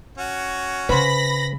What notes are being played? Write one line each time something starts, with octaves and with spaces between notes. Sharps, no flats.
C#4 F#4
C#3 B4 C5 B5 A#6